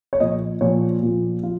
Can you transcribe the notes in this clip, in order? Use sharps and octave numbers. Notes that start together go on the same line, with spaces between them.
C#5
A#2 F3 D#5
A#2 F3 C#5
A#2 F3
F3 F4